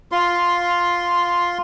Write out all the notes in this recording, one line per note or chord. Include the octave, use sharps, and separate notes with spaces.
F4 C6